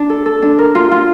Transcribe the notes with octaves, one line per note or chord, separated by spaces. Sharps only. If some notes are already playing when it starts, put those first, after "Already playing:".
Already playing: D4
A4
A4
D4
A#4
F4
F4